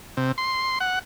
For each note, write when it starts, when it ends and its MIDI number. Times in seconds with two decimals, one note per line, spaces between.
0.17 0.32 48
0.38 0.79 84
0.80 0.99 78